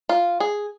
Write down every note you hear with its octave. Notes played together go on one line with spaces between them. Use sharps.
F4
G#4